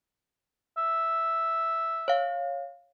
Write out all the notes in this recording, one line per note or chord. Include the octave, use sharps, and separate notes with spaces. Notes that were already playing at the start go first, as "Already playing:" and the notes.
E5
C#5 F5